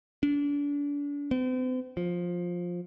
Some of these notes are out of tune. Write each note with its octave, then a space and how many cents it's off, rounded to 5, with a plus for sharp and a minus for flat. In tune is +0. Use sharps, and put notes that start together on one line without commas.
D4 -35
C4 -45
F3 +10